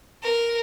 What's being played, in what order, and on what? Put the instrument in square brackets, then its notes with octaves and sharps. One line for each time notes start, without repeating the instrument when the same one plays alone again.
[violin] A#4